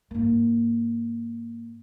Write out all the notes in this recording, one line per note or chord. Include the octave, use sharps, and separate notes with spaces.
G#2 A#3